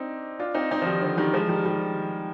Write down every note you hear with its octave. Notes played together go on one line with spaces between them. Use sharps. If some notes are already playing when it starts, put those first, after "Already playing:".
Already playing: C4 D4 D#4
D4 F4
C4 D#4
C4 D#4
F3
D#3 G3
D3 F3
D#3 G3
F3 G#3
D#3 G3
D#3 G3